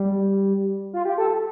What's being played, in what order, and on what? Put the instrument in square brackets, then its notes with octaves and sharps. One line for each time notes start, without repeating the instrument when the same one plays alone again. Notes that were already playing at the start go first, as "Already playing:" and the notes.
Already playing: [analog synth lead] G3
F4
G4
A4